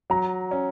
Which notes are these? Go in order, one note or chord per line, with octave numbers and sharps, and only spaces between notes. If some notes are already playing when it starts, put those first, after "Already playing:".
F#3 A#5
C#4